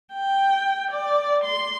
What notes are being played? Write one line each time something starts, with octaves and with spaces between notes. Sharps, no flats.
G5
D5
C6